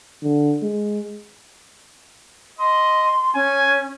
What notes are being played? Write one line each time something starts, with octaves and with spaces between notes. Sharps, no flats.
D3
G#3
D#5 C6
C#4 G#5